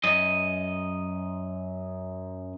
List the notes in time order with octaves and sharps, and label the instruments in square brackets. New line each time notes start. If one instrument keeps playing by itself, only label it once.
[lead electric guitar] F#2 D#5